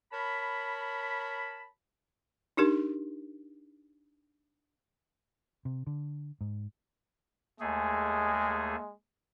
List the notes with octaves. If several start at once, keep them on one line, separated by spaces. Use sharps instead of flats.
A#4 C#5 A5 B5
D4 D#4 G4 A#4
C3
D3
G#2
D#2 G#3 A3 G#4